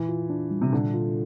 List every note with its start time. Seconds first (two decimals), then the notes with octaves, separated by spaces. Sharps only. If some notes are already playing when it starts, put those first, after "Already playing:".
Already playing: A#2 E3
0.09 F4
0.30 D4
0.51 G3
0.62 C3
0.72 A#2 D3
0.94 F4